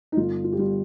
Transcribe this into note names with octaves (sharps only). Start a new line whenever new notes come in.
D#4
G1 F4
F4
G4
G3 F4